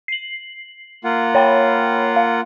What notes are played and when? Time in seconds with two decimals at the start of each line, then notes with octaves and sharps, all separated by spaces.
0.08 C7 F#7
1.04 A#3 F4 F#5
1.35 C#5 G5 B5
2.16 F5